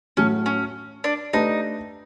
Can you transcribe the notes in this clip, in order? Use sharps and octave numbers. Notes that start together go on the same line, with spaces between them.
A2 F#3 A3 C#4
C#4
D4
A3 D4 D#4 G4 B4